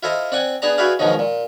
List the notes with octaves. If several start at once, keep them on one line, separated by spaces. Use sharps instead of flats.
E4 F4 A4 C5 D#5
C4 D5 F#5 G#5
B3 D4 G#4 D5 A5 A#5
E4 F#4 G#4 B4 D5 F5
G#2 B2 D#3 F3 F#3 D#4
A#2